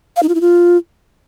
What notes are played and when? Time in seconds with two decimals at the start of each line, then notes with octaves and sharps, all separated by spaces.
0.16 F5
0.23 D#4
0.29 F4
0.35 E4
0.41 F4